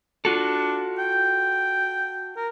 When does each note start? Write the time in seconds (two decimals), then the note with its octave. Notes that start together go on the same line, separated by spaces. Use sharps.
0.25 D4 F4 F#4 A4
0.99 G5
2.37 A#4